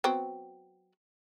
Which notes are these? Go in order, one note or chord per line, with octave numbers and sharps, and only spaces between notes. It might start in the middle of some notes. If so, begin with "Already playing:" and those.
F#3 B3 C4